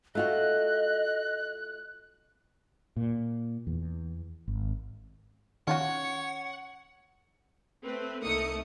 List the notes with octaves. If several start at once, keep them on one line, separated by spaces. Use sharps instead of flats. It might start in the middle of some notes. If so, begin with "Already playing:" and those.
A3 F4 F#4 D#5 F#6
A#2
E2
G#1
D#3 C#4 F4 F#4 C#5 F#5
A3 C4 B4
C2 A3 A#3 D#4 D#6 C#7